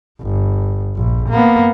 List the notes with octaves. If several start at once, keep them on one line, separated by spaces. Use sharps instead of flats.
G1
A#1
A#3 B3